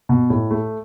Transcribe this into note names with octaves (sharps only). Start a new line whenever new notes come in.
B2
A2
A3